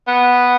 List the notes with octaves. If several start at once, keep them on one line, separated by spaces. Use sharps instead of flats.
B3